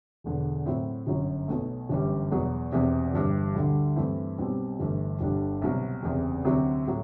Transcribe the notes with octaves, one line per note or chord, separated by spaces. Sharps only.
E1 E2 D3
A2 F#3 C4 E4
G1 F#2 F#3
B1 B2 A3
G1 F#2 E3 G3
E2 B2 F#3
E1 E2 C3
G1 G2 E3 G3
D2 D3 G3 D4
G2 E3 A3 C4 E4
B1 B2 G3 C4
G1 G2 E3 A3
G1 G2 D3 G3 D4
C2 B2 F#3
F#1 E2 C3
D2 C3 F#3
A2 F#3